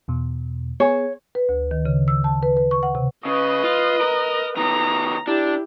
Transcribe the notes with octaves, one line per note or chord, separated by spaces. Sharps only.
E2 B2
B3 G#4 C#5 G#5
B4
D2
D#3
C#3
E6
A5
B4
B4
C#6
F#5
C3
C#3 B4 D#5
F4
A#4
D#3 B3 A#5
D4 E4 G4